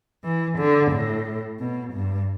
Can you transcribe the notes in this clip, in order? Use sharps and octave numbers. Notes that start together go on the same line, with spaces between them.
E3
D3
A2
B2
G2